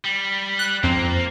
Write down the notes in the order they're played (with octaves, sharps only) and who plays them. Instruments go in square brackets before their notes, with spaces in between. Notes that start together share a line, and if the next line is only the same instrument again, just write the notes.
[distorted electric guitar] G3
[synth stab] F#6
[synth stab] F2 C4 [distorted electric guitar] A#3